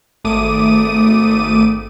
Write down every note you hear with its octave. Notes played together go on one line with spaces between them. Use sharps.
G#1 A3 D6 D#6 D#7